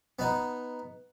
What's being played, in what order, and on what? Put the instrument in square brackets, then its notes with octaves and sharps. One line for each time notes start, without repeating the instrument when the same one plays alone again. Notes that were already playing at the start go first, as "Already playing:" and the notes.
[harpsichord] B3 D#4